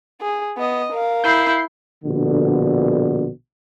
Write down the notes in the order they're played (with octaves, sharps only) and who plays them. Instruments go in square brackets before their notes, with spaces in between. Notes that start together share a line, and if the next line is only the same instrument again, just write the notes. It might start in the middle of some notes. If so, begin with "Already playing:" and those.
[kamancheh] G#4
B3 D#5
A#4 F5
[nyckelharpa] E4 [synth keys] G6 C7
[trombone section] A#1 B2 D3